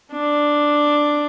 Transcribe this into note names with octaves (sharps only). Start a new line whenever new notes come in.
D4